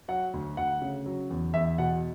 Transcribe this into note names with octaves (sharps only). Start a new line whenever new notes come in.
F#3 F#5
D2
D2 F#5
C#3
F#3
E2
E2 E5
B2 F#5